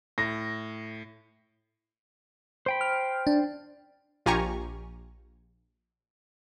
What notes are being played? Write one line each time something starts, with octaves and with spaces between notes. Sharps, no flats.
A2 A#6
C5 G5 B5
F6
D4
A#1 F4 G4 G#5 A#5 C#6